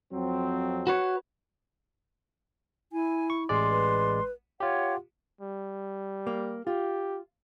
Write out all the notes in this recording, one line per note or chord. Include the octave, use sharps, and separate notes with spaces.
F2 F#3 C4
F#4 B4 C#5
E4 G#5
C#6
A1 G#3 D5 C6
B4
F4 G4 C#5 F#5
G3
A#3
F4 G4